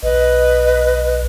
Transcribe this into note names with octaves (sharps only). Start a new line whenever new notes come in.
B1 B4 D#5